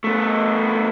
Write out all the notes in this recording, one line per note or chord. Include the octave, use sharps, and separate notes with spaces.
A3 B3